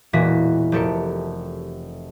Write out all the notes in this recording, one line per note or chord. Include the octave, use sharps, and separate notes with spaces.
E1 A#2 E3 F#4 A#6 B6
F1 G4 A4 A#4 C#7